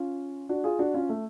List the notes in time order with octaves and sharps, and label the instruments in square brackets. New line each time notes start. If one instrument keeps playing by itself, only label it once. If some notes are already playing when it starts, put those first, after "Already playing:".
Already playing: [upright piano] C#4 F4
D4 F#4
F4 G#4
D4 F#4
C#4 F4
A3